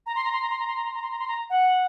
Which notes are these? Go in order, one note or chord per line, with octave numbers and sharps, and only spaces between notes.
A#5
C6
A#5
C6
A#5
C6
A#5
C6
A#5
C6
A#5
C6
A#5
C6
A#5
F#5